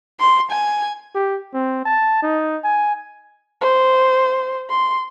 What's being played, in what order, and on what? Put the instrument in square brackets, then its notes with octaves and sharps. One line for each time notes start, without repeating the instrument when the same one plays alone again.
[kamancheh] C6
G#5
[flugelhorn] G4
C4
A5
D#4
G#5
[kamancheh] C5
C6